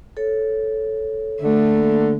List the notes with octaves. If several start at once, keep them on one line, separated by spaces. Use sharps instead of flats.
A4 C#5
D3 A3
A#3